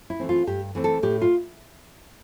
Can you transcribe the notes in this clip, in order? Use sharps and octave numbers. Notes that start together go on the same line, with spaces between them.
E4
E3 A3 C4
F4
G2 G4
E3 A3 C4
A4
A2 G4
F4